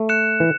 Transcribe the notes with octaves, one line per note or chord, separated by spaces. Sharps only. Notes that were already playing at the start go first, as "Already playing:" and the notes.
Already playing: A3
F#6 C#7 E7
E3